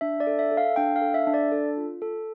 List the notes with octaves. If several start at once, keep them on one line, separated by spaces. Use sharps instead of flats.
D4 E5
D5
A4
E5
A4
F5
D4 G5
F5
A4
E5
D4
D5
A4
F4
A4